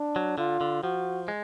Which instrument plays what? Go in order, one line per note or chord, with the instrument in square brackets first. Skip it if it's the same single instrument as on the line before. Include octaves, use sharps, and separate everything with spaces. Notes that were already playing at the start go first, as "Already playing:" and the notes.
Already playing: [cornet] D4
[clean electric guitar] F#3
[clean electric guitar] D3 [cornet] F4
[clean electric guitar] D3
[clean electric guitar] F3 [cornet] F#4
[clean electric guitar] G#3